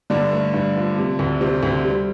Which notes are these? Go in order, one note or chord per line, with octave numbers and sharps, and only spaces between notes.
G2 D3 D4
A3
G2
F3
C3
D2
C3 C4
D2
G3